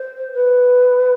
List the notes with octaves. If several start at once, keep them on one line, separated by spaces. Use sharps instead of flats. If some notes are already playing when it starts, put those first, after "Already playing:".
Already playing: C5
B4